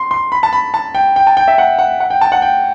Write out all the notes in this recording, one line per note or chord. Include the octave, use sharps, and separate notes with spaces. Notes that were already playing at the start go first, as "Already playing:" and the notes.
Already playing: C6
C6
B5
A5
B5
A5
G5
G5
A5
G5
E5
F#5
F#5
F#5
G5
A5
F#5
G5